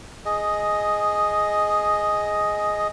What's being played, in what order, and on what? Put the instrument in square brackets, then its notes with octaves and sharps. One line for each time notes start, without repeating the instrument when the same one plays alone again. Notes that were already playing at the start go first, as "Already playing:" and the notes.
[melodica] G#4 D#5